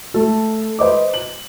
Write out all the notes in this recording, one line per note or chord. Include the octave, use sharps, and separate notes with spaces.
A3 A4
B4 C5 D#5 D6
F#7